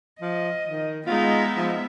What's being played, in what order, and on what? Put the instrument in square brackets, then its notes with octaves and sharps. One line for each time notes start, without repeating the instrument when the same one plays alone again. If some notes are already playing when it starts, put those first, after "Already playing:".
[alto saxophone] F3 [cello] D#5
[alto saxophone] D#3
[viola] G#3 D#4 [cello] B3 E5 [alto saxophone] F4
[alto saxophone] F3